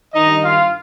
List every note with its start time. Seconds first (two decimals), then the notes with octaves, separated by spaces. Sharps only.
0.13 G2 D#3 D#4 D#5
0.44 F4 F5